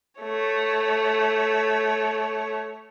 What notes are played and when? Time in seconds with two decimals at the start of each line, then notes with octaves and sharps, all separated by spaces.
0.21 A3 C#5